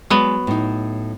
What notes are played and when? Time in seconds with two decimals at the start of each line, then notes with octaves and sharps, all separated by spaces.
0.10 F#3 G#3 B3 D5
0.47 A2 D#4